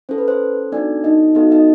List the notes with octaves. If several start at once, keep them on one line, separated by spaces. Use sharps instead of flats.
C#4 E4 A4 C5
B4
C5
B3 D4 D#4 F#4 A4 D5
D#4 D#5
B3 D#4 F#4 A4 D#5
D#4 D#5